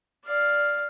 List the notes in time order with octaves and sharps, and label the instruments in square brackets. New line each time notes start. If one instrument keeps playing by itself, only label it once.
[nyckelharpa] D5 F5